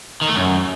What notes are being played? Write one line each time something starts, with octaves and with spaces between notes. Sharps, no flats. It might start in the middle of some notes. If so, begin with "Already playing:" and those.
D#3
A3
F#2